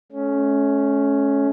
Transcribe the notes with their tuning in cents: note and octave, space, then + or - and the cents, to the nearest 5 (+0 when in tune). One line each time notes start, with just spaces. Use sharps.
A3 -35 C#4 +5